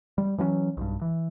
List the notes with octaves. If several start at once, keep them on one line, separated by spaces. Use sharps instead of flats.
G3
E3 F#3 B3 C#4
B1 G2
E3